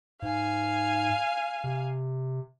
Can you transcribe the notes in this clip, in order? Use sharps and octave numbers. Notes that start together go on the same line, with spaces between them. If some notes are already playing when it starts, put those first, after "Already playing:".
G#2 F5 G#5
C3